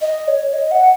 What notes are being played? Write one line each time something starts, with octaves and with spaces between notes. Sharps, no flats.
D#5
C#5
D#5
F#5